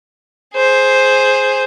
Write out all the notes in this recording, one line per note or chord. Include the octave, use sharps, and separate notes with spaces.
G#4 C5